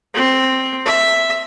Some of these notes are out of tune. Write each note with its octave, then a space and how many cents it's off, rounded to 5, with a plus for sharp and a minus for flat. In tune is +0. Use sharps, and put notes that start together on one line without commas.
C4 +5
E5 +0